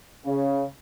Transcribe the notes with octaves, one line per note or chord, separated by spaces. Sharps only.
C#3